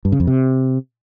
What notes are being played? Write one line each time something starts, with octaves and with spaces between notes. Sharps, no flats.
G2
C#3
F2
C3